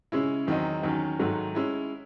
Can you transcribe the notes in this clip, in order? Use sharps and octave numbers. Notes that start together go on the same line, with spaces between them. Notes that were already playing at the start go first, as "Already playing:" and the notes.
C#3 G#3 C#4 E4
E2 D#3 F#3 C4 D#4
E2 D#3 F#3 C#4
G#2 D#3 F#3 A3
G#3 C#4 E4